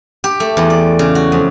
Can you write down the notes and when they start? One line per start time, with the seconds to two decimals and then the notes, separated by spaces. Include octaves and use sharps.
0.24 G4
0.40 A3
0.57 E2
0.70 D5
0.99 C#3
1.15 F#4
1.32 F2